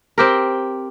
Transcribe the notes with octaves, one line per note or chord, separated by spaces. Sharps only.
C4 G4 A#4